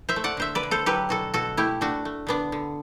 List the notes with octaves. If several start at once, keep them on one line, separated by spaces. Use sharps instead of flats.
C5 E5
A3
D5 F#5
D3 C5 E5
B4 D5
D3
A4 C5
F#3 G4 B4
B2 F#4 A4
B2 F#4 A4
A3 E4 G4
A3 D4 F#4
A3
D3 B3 D4
D3